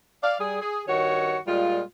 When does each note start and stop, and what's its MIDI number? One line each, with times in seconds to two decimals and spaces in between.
0.23 0.36 74
0.23 0.36 77
0.40 0.58 55
0.40 0.58 68
0.61 0.82 68
0.87 1.37 43
0.87 1.37 51
0.87 1.37 66
0.87 1.37 73
1.48 1.81 46
1.48 1.81 55
1.48 1.81 56
1.48 1.81 65